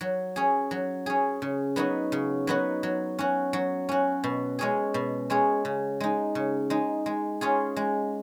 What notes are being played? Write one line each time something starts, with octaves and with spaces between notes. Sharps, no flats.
F#3
C#4 G#4
F#3
C#4 G#4
C#3
F#3 B3 D#4 F#4
C#3
F#3 B3 D#4 F#4
F#3
C#4 F#4
F#3
C#4 F#4
B2
G#3 C#4 G#4
B2
G#3 C#4 G#4
C#3
G#3 D#4
C#3
G#3 D#4
G#3
C#4 F4 G#4
G#3